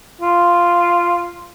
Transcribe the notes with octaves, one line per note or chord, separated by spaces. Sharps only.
F4